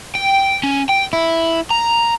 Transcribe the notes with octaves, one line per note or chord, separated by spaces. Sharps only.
G5
C#4
G5
E4
A#5